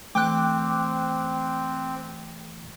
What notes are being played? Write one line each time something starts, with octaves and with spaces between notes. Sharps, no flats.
E3 A3 C4 G5 D6 F#6